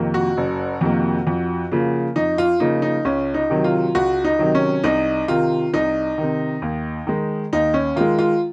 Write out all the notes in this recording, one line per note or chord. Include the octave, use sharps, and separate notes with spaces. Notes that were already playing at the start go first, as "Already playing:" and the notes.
Already playing: F2 C3 D#3 A#3
F#4
F#1
F2 C3 D#3 A#3
F2
C#3 F3 A#3
F2 D#4
F4
C#3 F3 A#3 D#4
D#4
C#2 C#4
D#4
C3 D#3 F#3
F4
C#2 F#4
D#4
C3 D#3 F#3
C#4
C2 D#4
C3 D#3 F4
C2 D#4
C3 D#3
D#2
D#3 G#3
D#2 D#4
C#4
D#3 G#3 F4
F4